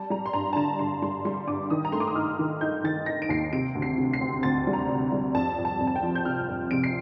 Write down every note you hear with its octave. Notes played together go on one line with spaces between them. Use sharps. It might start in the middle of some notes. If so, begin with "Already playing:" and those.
Already playing: G3 A5
G3 A#5
C6
G2 A#5
A5
D3 A#5
D3 C6
G3 C6
G3 C6
G2 D6
D#3 D#6
A#5
A3 C6
D6
D#6
D#4 F6
D#3
D#4 G6
D#3 A6
D#4 A#6
D7
D#2 C7
C3 D7
D2
C7
C3
C7
C4
D2 A6
G3
A#5
C3
G3
F2 A5
F2
A5
F2
A5
G5
F3
G6
C3 F6
F2
C3 D7
C7